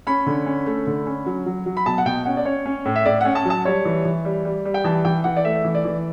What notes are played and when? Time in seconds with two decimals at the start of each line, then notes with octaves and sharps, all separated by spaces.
0.07 C#4 B5
0.26 D3
0.46 C#4
0.66 A3
0.87 D3
1.07 C#4
1.26 F#3
1.46 F#3
1.66 F#3
1.77 B5
1.86 B2 A5
1.98 F#5
2.05 B2 G5
2.25 C#4 F#5
2.37 D5
2.45 C#4 C#5
2.66 C#4
2.85 A2
2.96 E5
3.06 A2 D5
3.21 C#4 F#5
3.35 A5
3.45 F#3
3.50 A5
3.65 G3 C#5
3.85 E3
4.05 E3
4.25 G3
4.45 G3
4.65 G3
4.74 G5
4.84 E3 A5
5.05 E3 G5
5.24 E3 F#5
5.37 D5
5.45 A3 E5
5.65 E3
5.75 D5
5.85 E3